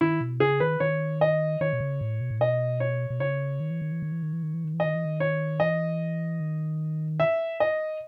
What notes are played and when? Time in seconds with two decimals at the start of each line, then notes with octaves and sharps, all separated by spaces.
0.01 D#3 E4
0.21 B2
0.40 C#3 G#4
0.60 D#3 B4
0.80 D#3 C#5
1.21 D#5
1.61 D#3 C#5
1.73 B2
1.81 C#3
2.01 A2
2.21 B2
2.31 A2
2.40 B2 D#5
2.80 C#5
3.10 B2
3.20 C#3 C#5
3.60 D#3
3.70 E3
3.82 D#3
3.92 E3
4.02 D#3
4.12 E3
4.23 D#3
4.33 E3
4.43 D#3
4.54 E3
4.64 D#3
4.74 E3
4.80 D#3 D#5
4.95 E3
5.05 D#3
5.20 C#5
5.60 E3 D#5
6.40 D#3
7.20 E5
7.60 D#5